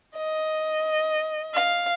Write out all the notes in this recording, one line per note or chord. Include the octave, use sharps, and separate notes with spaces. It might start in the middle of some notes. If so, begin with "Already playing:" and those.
D#5
F5